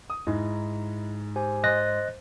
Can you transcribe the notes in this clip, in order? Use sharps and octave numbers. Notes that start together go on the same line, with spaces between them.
D#6
G#2 D#4 E4 D#5
G4 C5 G#5
C5 D#5 C6 F#6 A6 A#6